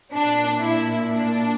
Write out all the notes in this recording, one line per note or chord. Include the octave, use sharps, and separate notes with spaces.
A#2 D4
E4
D4